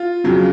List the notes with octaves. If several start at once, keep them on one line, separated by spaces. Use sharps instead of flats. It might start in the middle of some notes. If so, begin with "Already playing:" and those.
Already playing: F4
F2 C#3 F#3